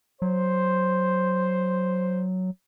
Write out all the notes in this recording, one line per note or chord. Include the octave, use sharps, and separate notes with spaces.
F#3 C5